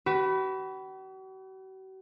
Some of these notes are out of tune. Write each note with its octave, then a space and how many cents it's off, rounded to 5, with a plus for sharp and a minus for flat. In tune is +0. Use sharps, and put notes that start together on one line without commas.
F#4 +45 B4 +0